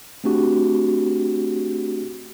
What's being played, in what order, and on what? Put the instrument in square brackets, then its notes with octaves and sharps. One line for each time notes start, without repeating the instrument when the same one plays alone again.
[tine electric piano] A3 C4 D4 F#4 G4